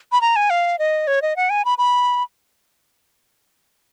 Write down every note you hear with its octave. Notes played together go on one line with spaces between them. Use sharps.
B5
A#5
G#5
F5
D#5
C#5
D#5
F#5
G#5
B5
B5